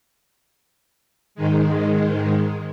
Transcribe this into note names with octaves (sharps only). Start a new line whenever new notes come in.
G#2 D#3 G#3